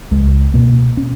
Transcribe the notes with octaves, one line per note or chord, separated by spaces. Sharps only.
C#2 G#3
B2 A#3
C#4